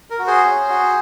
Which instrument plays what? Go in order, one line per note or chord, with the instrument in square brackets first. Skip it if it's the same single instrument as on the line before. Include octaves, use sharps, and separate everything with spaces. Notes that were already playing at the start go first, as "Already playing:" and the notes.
[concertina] A#4
F#4
G#4 C5
C#4
F#4